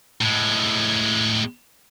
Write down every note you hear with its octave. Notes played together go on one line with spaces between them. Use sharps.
A2 G#3